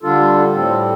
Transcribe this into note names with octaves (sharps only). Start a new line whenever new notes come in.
D3 G3 D4 F4 A4
A2 G3 C4 A4